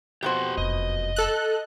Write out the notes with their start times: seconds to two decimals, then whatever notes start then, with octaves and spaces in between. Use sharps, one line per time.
0.23 F2 B2 G4 C5 F#5
0.57 F1 F#2 D#5
1.16 A4 F#6